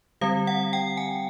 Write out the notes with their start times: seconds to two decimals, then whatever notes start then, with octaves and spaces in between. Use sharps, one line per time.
0.21 D3 G3 C4 F5
0.47 F#5
0.73 G5
0.97 G#5